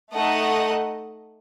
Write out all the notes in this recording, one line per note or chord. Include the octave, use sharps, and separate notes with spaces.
A3 D#4 A4 D#5 F#5